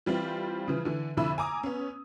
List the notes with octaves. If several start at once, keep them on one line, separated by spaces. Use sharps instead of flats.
E3 G3 C4 F4
C#3 E3 F3
D3 E3
C2 F2 D3 E4 B5 E6
G#5 A#5 D6 D#6
B3 C#4